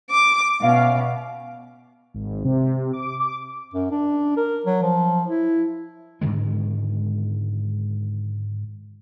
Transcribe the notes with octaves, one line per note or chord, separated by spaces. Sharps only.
D6
B2 C#4 E5 F5
G#1
C3
D6
D6
F#2
D4
A#4
F#3
F3
E4
G#2 D3 D#3 G#3